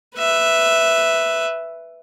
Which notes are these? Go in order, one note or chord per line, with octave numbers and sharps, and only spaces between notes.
B4 E5